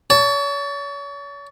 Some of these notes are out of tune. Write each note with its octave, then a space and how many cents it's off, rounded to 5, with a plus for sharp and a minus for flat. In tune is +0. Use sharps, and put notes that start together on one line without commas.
C#5 +35 A5 +0